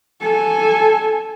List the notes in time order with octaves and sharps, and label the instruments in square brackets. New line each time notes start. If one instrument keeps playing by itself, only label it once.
[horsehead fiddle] A4 G#5